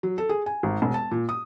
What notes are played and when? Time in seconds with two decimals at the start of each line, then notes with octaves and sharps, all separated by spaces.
0.03 F#3
0.18 A4
0.29 G#4
0.46 G#5
0.63 G#1
0.82 E1
0.94 A5
1.11 A#2
1.29 D#6